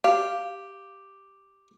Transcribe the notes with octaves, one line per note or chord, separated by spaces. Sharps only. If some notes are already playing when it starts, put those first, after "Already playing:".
G4 F5